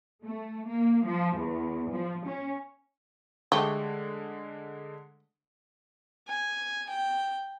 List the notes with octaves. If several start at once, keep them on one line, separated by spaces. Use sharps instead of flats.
A3
A#3
F3
E2
F3
C#4
D3 G#3 A3 G4
G#5
G5